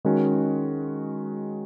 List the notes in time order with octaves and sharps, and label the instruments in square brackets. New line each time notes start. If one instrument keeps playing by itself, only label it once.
[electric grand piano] D#3 G#3 C#4 F#4